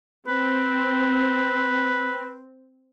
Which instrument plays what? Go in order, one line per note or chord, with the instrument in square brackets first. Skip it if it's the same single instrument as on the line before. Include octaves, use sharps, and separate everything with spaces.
[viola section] C4 [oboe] B4